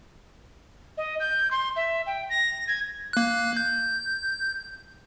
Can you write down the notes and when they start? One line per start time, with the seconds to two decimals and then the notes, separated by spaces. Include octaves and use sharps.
0.98 D#5
1.20 G6
1.51 C6
1.76 E5
2.07 G5
2.30 A#6
2.68 G#6
3.13 A#3 F#6
3.57 G6